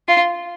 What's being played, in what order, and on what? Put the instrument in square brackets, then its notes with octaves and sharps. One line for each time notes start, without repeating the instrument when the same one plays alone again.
[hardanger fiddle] F4